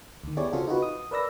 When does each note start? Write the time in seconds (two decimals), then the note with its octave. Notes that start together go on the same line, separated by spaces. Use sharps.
0.23 D2 D#3
0.37 B3 E4 G4 G#4 C#5 D5
0.52 C#3 C4 F4 F#4 G#4 A4
0.67 D#4 F4 F#4 B4
0.82 D#6
1.11 A#4 B4 D5 E6 A#6